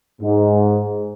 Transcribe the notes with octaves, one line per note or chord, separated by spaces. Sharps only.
G#2